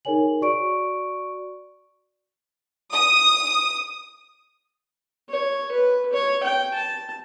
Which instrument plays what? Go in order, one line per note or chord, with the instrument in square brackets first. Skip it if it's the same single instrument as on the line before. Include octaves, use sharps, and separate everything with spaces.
[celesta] D#4 G#4 A#4 C#5 G#5 F#7
F#4 D5 C#6 D7
[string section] D#6
[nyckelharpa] C#5
B4
C#5
G5
A5